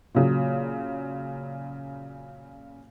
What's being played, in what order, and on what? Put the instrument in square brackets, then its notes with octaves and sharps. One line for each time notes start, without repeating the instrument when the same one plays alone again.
[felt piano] A#2 C#3 F#3